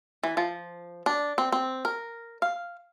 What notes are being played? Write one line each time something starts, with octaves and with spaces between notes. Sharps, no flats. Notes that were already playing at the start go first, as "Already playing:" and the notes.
E3
F3
D4
C4
C4
A#4
F5